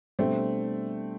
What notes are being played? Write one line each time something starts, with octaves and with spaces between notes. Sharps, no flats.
B2 G3 A3 C4 D4 A4 C5